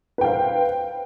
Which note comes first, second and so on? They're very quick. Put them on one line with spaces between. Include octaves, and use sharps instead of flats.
B4 G5 F5 C5